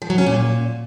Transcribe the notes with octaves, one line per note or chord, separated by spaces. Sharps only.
F3
F#3
C#4
A#2